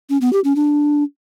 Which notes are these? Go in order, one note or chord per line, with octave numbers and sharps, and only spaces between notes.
C#4
B3
G4
C#4
D4